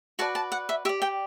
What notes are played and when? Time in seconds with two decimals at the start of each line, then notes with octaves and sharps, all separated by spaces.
0.19 F#4 B4 D5 A5
0.35 A5
0.52 F#5
0.69 E5
0.85 G4 E5
0.89 D5
1.02 G5